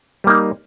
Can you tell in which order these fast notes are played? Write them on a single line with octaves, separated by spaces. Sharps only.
G3 A#3 D#4